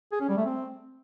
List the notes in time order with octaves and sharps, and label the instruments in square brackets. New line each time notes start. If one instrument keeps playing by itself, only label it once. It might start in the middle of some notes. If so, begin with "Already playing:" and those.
[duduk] G#4
C#4
G3
A3
C4